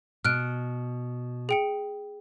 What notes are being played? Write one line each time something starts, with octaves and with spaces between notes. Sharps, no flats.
B2 F6 F#6 D7
G#4 G5 C#7